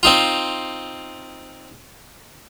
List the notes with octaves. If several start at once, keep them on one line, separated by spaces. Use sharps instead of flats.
C4 D#4 F4